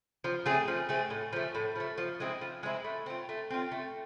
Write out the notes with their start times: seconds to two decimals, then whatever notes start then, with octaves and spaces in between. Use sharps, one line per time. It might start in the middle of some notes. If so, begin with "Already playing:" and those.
0.24 F3
0.46 A3 C4 G#4
0.68 F3
0.89 A3 C4 G#4
1.10 A2
1.33 F3 A3
1.55 A2
1.76 F3 A3
1.98 F3
2.20 G#3 C4 E4
2.41 F3
2.63 G#3 C4 E4
2.84 A3
3.06 C4 F4
3.29 A3
3.50 C4 F4
3.72 A3